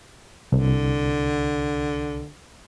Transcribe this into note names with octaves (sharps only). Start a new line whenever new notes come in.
C2 D3